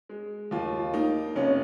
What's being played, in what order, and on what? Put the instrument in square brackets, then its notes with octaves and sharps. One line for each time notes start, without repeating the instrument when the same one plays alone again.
[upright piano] G#3
D#2 F4
A#3 D#4
F1 C#4